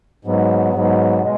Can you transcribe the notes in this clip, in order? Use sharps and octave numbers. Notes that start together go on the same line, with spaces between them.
G#2 F#3 B3
G#2 F#3 B3
B2 G#3